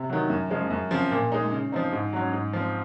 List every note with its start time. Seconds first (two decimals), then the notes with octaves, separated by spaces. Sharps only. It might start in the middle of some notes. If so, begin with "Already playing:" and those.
Already playing: C3
0.10 D#3 F#3
0.30 F#2
0.51 C#3 F3 G#3
0.70 F#2
0.91 C#3 F3 C4
1.11 A#2
1.32 G#3 D#4
1.52 C#3
1.72 F3 C4 D#4
1.92 G#2
2.13 F#3 C#4
2.33 G#2
2.53 F3 C4